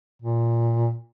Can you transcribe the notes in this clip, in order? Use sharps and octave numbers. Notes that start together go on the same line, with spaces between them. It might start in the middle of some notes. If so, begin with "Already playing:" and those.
A#2